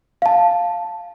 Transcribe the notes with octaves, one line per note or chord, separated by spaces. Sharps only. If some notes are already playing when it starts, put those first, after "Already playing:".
F5 A5